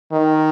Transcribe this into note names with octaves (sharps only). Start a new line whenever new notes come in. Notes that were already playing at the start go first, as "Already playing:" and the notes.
D#3